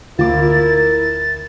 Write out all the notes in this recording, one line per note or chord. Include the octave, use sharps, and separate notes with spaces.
D2 E4 F4 A#4 D6 A6